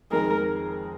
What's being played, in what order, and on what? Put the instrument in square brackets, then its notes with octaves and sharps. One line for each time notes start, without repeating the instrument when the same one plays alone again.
[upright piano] F2 D#3 G#3 D#4 G#4 [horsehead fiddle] A#4